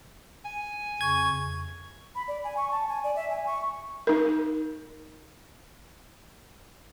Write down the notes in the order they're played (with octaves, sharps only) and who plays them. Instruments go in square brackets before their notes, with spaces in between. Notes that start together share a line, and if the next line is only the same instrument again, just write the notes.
[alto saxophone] G#5
[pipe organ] F2 C#3 [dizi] C#6 [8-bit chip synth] G#6
[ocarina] B5
D5
G#5
C#6
A5
G#5
D5
E5
G#5
C#6
[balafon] D#4 A#4